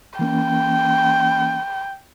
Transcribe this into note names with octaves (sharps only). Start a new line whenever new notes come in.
E3 A#3 C#4 G5